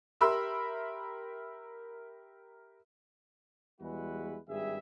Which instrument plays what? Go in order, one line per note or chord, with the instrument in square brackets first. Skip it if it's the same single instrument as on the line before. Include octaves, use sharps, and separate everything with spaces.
[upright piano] G4 A#4 E5 B5 C6 E6
[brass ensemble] E2 G3 G#3 E4 F#4 B4
G#1 G2 G3 G#4 E5